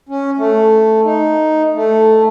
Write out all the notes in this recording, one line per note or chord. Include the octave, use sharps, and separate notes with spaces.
C#4
A3
D#4
A3